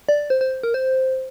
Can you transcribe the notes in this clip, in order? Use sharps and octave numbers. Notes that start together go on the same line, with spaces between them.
D5
C5
C5
A#4
C5